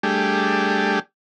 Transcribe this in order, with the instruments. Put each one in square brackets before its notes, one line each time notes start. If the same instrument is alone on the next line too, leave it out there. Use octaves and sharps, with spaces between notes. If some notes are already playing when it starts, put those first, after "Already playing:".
[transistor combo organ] G3 A3 D4 G4 G#4